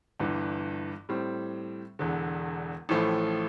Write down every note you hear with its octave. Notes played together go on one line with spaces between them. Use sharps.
G1 G2 E3
A2 G3 C4
E1 E2 D3
A1 A2 F3 A3